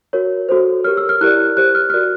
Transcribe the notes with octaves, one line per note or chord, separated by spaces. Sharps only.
F#4 A#4 C#5
F#4 A4 C5
G4 A#4 C#5 F6
E6
F6
E4 G4 A#4 D5 F#6
G4 C5 F#6
F6
F6
F#4 A#4 D5 F#6